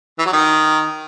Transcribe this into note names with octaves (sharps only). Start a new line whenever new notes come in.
E3
F#3
D#3